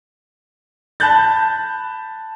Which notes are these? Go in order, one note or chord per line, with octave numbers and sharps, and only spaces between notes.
A5 B5 F#6 G6 A6